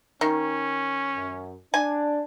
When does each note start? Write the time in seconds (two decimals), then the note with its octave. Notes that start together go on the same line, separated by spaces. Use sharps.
0.21 D#3 C#4
1.16 F#2
1.74 D4 G#5